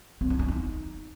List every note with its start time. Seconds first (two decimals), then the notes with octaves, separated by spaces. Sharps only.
0.21 C4
0.30 D4
0.39 C#4
0.48 D#4